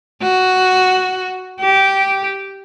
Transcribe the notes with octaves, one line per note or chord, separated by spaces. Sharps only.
F#4
G4